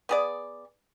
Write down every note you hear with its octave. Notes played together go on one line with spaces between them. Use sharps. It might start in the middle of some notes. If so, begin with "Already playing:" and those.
B3 G#4 D5